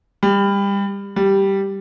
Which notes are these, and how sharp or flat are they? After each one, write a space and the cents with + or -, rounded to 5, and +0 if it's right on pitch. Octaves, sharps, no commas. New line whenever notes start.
G3 +25
G3 -5